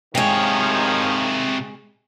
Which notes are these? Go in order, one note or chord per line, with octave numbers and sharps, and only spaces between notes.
C3 D#3 F3 G#3 C#5 G5